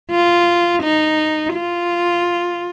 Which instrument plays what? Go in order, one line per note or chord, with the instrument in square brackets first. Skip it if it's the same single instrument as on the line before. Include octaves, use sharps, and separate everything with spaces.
[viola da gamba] F4
D#4
F4